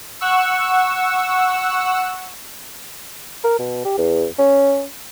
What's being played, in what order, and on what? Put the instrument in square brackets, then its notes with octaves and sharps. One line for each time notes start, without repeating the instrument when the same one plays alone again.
[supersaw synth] F#5 C#6 E6
[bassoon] A#4
B2
G4
E2
C#4